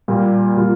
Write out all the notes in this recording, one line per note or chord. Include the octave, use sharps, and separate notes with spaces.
A#2 G3 A#3 F4
A#2 G3 A#3 F4